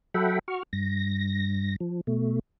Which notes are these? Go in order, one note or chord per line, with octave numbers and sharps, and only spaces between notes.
F#3 A4 E5 F#5 G5 B5
F#4 C#6 F6
G2 A#6
F3
B2 A3